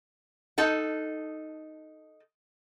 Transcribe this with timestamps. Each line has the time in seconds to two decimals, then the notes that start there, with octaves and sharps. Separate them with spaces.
0.58 D#4 A4 F#5